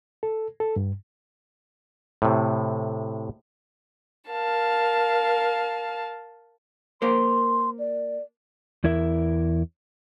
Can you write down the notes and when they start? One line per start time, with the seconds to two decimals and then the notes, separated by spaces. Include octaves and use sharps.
0.23 A4
0.60 A4
0.76 G2
2.22 A2 C3
4.30 A#4 F5 A5
7.02 A#3 A#4 C5 C6
7.79 D5
8.84 E2 E4 A#4 E5